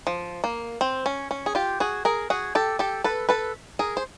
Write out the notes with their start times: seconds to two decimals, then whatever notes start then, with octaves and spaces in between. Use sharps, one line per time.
0.07 F3
0.44 A#3
0.81 C4
1.06 C#4
1.31 C#4
1.46 G#4
1.55 F4 G4
1.80 F#4 G#4
2.05 G#4 A#4
2.30 F#4 G#4
2.55 G4 A4
2.79 G4 A4
3.04 A4 B4
3.29 A4 B4
3.79 G#4 A#4
3.97 C5